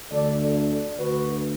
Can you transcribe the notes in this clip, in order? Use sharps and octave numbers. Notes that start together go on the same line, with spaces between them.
D2 D3 A4 D5
A4 D5
A4 D5
D2 D3 F#4 B4